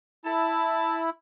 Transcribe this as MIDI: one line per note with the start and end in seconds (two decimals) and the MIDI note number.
0.25 1.10 64
0.25 0.99 81